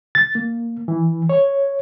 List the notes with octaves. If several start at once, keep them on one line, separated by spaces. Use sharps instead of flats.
A6
A#3
E3
C#5